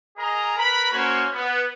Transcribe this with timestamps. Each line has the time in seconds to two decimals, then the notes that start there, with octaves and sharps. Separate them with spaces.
0.18 G#4 A#4 D#5 A#5
0.58 A#4 B4 B5
0.92 A#3 C#4 F#4 C5 C#5
1.32 B3